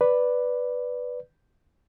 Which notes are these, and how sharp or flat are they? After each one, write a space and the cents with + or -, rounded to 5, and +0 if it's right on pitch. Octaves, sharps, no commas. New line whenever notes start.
B4 +0 D5 +0